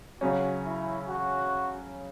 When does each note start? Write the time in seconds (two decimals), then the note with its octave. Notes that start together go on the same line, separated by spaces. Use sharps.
0.21 C#3 F#3 C#4 F#4
0.65 E4
1.09 F#4